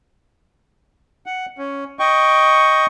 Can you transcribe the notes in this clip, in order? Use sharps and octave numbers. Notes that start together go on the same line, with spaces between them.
F#5
C#4
D#5 G5 C#6